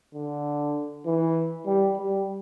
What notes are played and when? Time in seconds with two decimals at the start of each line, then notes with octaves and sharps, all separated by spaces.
0.14 D3
1.06 E3
1.66 G3
1.97 G3